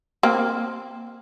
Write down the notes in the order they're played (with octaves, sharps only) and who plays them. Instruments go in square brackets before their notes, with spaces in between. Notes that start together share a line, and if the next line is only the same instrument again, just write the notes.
[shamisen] A#3 C4